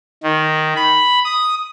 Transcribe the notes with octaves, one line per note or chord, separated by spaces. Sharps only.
D#3
B5
D#6